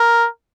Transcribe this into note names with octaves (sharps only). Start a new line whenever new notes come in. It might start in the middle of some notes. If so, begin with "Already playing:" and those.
Already playing: A#4